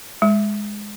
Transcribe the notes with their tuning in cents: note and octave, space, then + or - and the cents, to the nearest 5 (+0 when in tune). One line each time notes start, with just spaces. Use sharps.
G#3 -5